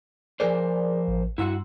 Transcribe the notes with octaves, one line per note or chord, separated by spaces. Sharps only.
F3 G#4 A#4 C5 D5
A1
G2 E4 F#4 F#5 C6 E6